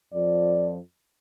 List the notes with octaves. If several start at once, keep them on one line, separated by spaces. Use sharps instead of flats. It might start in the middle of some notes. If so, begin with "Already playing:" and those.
F2 F3 D5